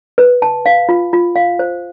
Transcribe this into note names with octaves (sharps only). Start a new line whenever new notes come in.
B4
A5
F5
F4
F4
F5
C5